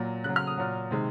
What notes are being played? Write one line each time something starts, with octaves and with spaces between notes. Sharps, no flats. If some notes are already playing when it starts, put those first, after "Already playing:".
Already playing: A#2 F#3
C#3 F#3 F#6
F6
D#6
A#2 F#3
C3 D#3 G#3